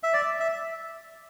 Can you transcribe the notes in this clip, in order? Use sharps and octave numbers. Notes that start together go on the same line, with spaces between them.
E5
D5
E5